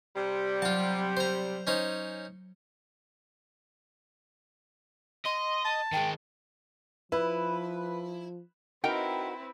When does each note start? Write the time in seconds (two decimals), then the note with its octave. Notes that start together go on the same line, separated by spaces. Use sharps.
0.16 C3 G3
0.62 F#3 F4 A5
1.17 C5 A#5
1.67 C#4 D#4 C5
5.25 D#5 C6
5.65 A5
5.93 D#3 G#3 G5
7.12 F3 E4 B4
8.84 C4 D#4 E4 F#4 A#4 B4 G5